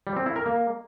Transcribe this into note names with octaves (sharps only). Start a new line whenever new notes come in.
G3
C4
E4
A#4
A#3